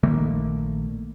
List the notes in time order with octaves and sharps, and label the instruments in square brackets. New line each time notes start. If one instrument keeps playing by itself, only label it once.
[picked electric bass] A#1 D#3 A3 A#3